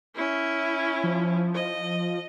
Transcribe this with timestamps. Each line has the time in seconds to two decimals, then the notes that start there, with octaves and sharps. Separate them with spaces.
0.15 C#4 E4
1.04 F3
1.54 D#5